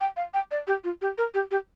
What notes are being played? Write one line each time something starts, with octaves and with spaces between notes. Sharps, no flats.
G5
F5
G5
D5
G4
F4
G4
A#4
G4
G4